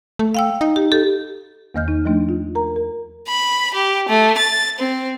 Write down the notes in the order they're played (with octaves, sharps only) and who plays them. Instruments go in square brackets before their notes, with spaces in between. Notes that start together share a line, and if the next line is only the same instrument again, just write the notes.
[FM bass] A3
[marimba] F5 G5 E6
[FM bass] D#4
[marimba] G4
G4 A4
E2 D#3 A#3 D#5 F6 G6
D#4
F3 A3 D4
F4
A#4 A#5
A#4
[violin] B5
G4
A3
A6
C4